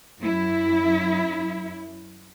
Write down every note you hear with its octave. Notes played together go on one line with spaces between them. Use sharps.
F#2 E4